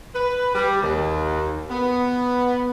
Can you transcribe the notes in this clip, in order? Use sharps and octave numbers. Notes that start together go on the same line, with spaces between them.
B4
G3
D#2
B3